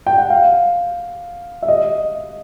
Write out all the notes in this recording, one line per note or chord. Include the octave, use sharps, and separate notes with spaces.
G5
F#5
F5
E5
D#5